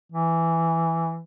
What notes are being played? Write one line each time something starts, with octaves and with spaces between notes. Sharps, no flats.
E3